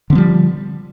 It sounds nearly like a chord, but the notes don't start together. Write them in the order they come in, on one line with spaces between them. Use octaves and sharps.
D3 C4 F3 G3